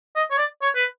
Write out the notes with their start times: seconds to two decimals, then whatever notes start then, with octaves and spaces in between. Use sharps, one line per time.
0.16 D#5
0.30 C#5
0.38 D5
0.62 C#5
0.75 B4